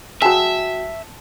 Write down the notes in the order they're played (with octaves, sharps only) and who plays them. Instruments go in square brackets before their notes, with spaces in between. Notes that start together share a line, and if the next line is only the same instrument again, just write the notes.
[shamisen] F#3 G#4 [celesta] F#4 G5 [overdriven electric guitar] E5 [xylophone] A5